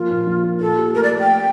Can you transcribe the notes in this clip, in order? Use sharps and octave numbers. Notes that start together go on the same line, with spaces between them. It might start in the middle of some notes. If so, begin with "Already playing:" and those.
Already playing: F3 A#3 F4
A#2
A#1
A#3
A#2 A4
G4
A3 A#4
D5
A3
G5